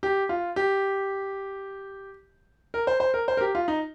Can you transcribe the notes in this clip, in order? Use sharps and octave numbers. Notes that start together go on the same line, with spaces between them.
G4
F4
G4
A#4
C5
C5
A#4
C5
A#4
G4
F4
D#4